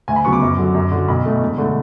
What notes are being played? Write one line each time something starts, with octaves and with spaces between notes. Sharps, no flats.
D2 G#5
B5
C#3 F#3 B3 C#6
D6
F#2
D3 F#3
F#2
D3 F#3
B1 B5
B2 A3
E1
D3 A3